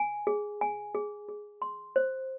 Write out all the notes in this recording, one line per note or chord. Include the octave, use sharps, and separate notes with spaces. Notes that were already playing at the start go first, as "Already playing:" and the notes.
Already playing: G#5
G#4
G#5
G#4
G#4
C6
C5